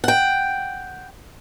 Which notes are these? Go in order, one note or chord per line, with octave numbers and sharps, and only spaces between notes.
F#5 G5